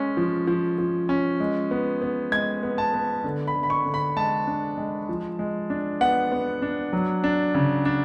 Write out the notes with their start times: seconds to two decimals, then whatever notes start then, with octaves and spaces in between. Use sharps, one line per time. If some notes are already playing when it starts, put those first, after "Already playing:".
Already playing: G#3 C#4
0.17 F3
0.47 F3
0.78 F3
1.09 C#4
1.40 G#3
1.71 B3
2.02 B3
2.32 G#3 G#6
2.63 B3
2.78 A5
2.94 B3
3.24 D3
3.47 B5
3.55 D3
3.63 B5
3.70 C#6
3.86 D3
3.94 B5
4.17 G#3 A5
4.47 D4
4.77 G#3
5.09 F3
5.39 G#3
5.70 D4
6.01 B3 F#5
6.32 B3
6.62 D4
6.93 F#3
7.24 D4
7.54 C#3
7.85 D4